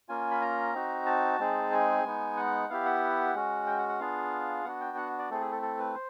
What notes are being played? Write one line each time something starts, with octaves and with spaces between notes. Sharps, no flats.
A#3 C#4 F4 G#5
B5
A#5
C4 D#4 F#4
A5
G#3 C4 D#4 G#4
G#5
G#3 B3 D#4
F#5
B3 E4 G4 F5
F#5
G#3 C#4 F#4
G5
F#5
F#5
B3 D4 F4 G#4 F5
B3 D4 F#4 F#5
G5
F#5
D5
A3 C4 E4 G#4 A4
G#4
A4
A4
B4
C5